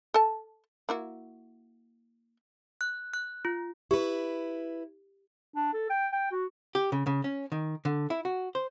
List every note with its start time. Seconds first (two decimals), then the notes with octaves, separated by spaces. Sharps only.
0.14 A4 A5
0.89 A#3 E4 F#4
2.81 F#6
3.13 F#6
3.45 F4
3.91 E4 G4 B4
5.55 D4
5.73 A4
5.89 G5
6.13 G5
6.31 F#4
6.75 G4
6.92 C#3
7.07 C#3
7.24 C#4
7.52 D#3
7.85 D3
8.10 E4
8.25 F#4
8.55 C5